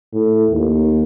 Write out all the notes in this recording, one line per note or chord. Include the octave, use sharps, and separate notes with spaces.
A2
D#2